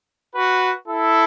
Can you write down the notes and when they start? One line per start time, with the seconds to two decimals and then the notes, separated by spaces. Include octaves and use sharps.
0.34 F#4 B4
0.87 E4 A4